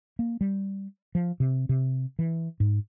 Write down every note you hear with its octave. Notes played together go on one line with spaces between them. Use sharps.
A#3
G3
F3
C3
C3
E3
G#2